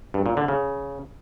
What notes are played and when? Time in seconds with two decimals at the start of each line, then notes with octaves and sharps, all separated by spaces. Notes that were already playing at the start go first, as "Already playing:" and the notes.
0.14 G2
0.26 A#2
0.37 D3
0.48 C#3